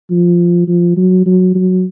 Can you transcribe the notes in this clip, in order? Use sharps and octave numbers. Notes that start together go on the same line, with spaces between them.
F3
F3
F#3
F#3
F#3